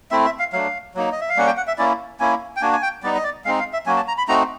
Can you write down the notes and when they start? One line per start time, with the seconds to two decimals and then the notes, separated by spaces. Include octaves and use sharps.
0.11 A3 C4 E4 E5
0.25 E5
0.39 F5
0.53 F#3 A3 D4 F5
0.94 F#3 A#3 D#4
1.12 D#5
1.21 E5
1.30 F5
1.36 G3 A#3 C#4 F#5
1.46 G5
1.57 F#5
1.67 E5
1.78 A#3 C#4 E4 D5
2.20 A#3 C#4 E4 G#5
2.56 G5
2.61 A#3 D4 F#4 G#5
2.73 G#5
2.82 G5
3.03 G3 B3 D#4 D5
3.15 D#5
3.24 D5
3.45 G#3 C4 D#4 F5
3.59 F5
3.73 E5
3.86 F#3 A#3 C#4 F#4 G#5
3.97 A5
4.08 A#5
4.18 B5
4.28 A3 C4 D#4 F#4 A#5